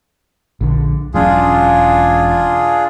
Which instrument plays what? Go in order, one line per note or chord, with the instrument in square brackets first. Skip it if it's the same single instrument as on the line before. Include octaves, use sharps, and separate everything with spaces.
[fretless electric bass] A#1 D3
[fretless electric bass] E1 F#3 C#4 [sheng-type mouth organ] D4 F4 G#4